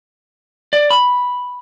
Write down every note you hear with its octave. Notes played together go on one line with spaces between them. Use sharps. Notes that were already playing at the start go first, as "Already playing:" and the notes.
D5
B5